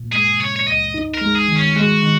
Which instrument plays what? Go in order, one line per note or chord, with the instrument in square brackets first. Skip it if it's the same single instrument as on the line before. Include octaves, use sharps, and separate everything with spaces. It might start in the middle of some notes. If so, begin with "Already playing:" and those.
Already playing: [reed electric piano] A#2
[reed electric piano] G#3 [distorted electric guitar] G#4
[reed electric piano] C#3 [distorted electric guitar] C#5
[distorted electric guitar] C#5
[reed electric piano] C#2 [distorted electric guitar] D#5
[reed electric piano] D#4
[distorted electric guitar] A#4
[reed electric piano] G#3
[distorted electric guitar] G#4
[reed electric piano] D#3
[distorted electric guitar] C#4
[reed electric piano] G#3 [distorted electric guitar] F#4
[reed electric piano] D#3